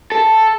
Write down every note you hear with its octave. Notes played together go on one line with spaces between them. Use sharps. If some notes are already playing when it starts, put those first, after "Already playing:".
A4